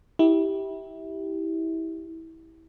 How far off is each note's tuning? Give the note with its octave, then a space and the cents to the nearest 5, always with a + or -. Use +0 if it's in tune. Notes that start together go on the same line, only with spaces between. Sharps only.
E4 -25 G4 -5